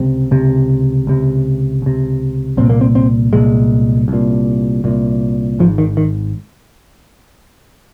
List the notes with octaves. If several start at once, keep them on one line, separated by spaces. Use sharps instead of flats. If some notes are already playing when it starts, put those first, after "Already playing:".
Already playing: C#2 C3 C4
C#2 C3
C#2 C3
C#2 C3
C2 A#2 C4
A#3
C4
C4
C2 A#2 G#3
C2 A#2
C2 A#2
G#1 G#2 F3
D#3
D#3